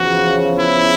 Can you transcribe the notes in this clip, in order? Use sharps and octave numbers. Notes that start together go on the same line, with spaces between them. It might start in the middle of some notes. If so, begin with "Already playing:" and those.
Already playing: E2 C#3 F3 F#4
E4